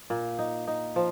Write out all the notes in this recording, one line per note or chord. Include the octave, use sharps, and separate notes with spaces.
A#2
D#4
D#4
F3